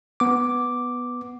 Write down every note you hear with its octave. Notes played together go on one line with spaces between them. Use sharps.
B3 D6